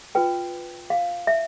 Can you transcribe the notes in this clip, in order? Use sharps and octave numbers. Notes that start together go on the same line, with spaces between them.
F4 B4 G5
F5
E5